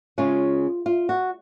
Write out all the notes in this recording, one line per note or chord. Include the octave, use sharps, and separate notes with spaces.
C#3 G#3 C#4 F4
F4
F#4